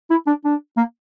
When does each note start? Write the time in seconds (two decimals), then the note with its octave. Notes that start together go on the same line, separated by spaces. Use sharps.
0.11 E4
0.27 D4
0.44 D4
0.77 A#3